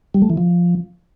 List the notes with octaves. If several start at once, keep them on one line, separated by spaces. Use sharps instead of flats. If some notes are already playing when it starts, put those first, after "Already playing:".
G3
A3
E3
F3